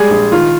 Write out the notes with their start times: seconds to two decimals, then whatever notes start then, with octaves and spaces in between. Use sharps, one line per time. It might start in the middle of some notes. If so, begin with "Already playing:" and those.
Already playing: G3 G#3 G#4
0.10 A#1
0.32 D#3 F4